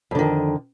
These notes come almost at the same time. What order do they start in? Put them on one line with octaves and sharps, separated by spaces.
F2 D3 D#3